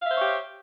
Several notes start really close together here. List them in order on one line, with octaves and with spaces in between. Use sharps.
F5 E5 C5 C#5 G4